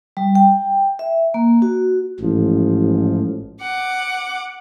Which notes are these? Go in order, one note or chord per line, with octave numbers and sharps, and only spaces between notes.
G3
G5
E5
A#3
F#4
A1 G#2 F3
F#5 D6